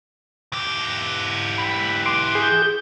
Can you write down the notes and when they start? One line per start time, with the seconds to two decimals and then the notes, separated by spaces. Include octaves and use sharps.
0.53 E3 G4
1.58 B5
2.06 C6 D6
2.35 G#4 G6